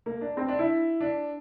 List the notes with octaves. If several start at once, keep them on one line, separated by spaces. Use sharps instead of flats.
A#3
D4
C4
D4
E4
D4